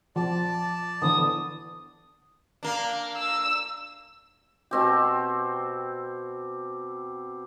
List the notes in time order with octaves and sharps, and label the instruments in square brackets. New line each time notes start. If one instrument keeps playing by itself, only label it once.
[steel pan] F3 [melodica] D5 A5
[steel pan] D3 E3 B3 [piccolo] D#6
[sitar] A#3 D4
[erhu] E6
[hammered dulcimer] B2 C4 G4